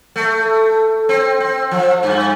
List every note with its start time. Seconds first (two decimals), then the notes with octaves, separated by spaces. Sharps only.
0.16 A3
1.09 C4
1.40 C4
1.71 F3
2.03 G2